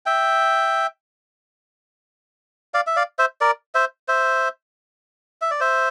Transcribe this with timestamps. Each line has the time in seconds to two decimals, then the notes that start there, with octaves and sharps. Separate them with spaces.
0.06 E5 G5
2.74 D5 F5
2.87 E5
2.96 D5 F5
3.19 C5 E5
3.41 A#4 D5
3.75 C5 E5
4.08 C5 E5
5.42 E5
5.51 D5
5.60 C5 E5